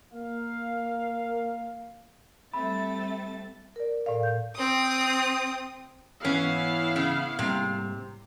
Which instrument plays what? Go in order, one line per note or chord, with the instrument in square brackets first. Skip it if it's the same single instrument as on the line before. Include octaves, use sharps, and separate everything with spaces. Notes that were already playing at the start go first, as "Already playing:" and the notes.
[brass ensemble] A#3 F5
[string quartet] G3 A3 A6 [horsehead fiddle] C4 E5 [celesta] B5
[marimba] A#4 D5
A2 A#4 D5 F5
G6
[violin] C4 D#6
[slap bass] G#2 E3 [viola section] B3 E4 F5 [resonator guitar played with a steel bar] C#4
[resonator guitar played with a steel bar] C#3
[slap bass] G#2 G3 A#3 [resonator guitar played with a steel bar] C3